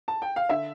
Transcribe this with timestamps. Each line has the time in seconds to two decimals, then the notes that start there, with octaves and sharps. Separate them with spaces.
0.08 A5
0.22 G5
0.36 F5
0.49 D3 E5